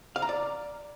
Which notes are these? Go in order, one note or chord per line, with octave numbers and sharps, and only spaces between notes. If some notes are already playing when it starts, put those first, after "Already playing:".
F5
A#5
D5